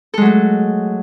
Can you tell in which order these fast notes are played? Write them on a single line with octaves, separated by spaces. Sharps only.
A4 G#3 F#3 A3